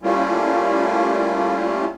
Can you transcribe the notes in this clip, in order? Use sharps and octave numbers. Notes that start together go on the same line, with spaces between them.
G3 A3 A#3 C#4 E4 F4